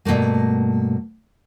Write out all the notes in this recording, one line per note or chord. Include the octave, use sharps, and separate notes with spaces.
G2 B2 E3 A3 A#3